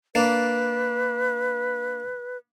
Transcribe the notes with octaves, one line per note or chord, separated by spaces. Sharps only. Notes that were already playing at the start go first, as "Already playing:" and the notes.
A#3 D4 B4